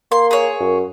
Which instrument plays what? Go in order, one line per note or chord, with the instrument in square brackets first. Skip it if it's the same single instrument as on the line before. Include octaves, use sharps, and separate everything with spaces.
[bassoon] A#3 [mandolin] C6
[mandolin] G#4 C#5
[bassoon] F#2